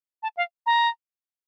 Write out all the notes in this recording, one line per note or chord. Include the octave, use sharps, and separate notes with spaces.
A5
F5
A#5